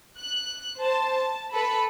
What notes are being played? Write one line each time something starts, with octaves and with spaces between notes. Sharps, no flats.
F#6
C5 A5
A5
A4 B4 B5